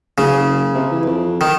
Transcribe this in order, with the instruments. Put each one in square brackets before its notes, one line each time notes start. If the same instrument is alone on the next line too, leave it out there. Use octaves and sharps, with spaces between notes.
[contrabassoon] F#1 [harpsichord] C#3
[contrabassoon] C3
E3
F2
[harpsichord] D#3